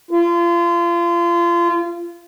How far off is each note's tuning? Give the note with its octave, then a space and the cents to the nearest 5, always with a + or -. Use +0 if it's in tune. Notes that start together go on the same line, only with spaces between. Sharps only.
F4 -30